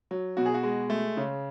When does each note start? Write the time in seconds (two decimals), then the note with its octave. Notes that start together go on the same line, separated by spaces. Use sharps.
0.11 F#3
0.37 B2 F#4
0.46 G#4
0.54 F#4
0.63 G#3
0.90 A3
1.17 C#3